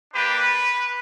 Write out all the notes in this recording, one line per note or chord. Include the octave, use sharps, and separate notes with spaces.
A#3 D4 G4 B4